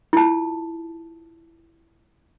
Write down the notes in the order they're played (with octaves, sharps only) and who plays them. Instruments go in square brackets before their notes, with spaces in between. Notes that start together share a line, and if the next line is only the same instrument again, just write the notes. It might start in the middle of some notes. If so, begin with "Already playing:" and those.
[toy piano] E4 F4 A5